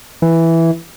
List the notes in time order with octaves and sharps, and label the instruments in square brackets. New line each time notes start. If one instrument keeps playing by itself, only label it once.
[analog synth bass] E3